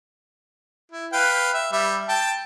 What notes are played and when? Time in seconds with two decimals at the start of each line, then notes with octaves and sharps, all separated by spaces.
0.92 E4
1.13 B4 F5 G5
1.54 E5
1.72 G3 E5
2.09 G5 A5